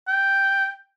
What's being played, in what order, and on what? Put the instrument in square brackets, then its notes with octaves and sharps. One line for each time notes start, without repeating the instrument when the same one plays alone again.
[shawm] G5